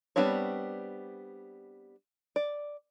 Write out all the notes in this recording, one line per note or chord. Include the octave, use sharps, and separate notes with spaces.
G3 B3 C4 D4 C#5
D5